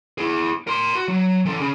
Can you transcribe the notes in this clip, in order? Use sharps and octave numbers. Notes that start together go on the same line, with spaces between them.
E4 G#4
A#4 C6
F#4
F#3
E3 A4
C#3